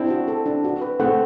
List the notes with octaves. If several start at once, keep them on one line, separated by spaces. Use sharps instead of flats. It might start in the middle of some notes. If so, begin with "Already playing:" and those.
Already playing: C4 D4 E4
F#4
A4
D4
F#4
B4
A3 C4 F#5